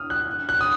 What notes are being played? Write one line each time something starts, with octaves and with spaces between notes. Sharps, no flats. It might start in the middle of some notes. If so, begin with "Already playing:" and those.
Already playing: D#6 F6
F#6
F#6
D#6